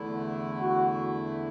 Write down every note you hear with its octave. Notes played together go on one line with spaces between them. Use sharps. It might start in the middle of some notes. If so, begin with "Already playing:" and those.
Already playing: E2 D3 A3 E4
F#4